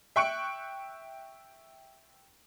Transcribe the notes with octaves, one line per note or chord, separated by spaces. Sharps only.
E5 G5 C#6 F#6 C#7 D7